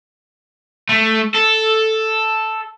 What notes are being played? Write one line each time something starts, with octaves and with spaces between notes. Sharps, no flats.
A3
A4